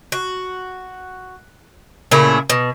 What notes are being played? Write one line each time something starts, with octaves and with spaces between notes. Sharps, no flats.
F#4
A#2 C#3 A3 E4
B2